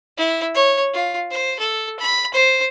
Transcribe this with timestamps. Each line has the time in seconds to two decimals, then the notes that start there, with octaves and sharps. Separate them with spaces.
0.18 E4
0.55 C#5
0.94 F4
1.31 C5
1.60 A4
1.99 B5
2.34 C5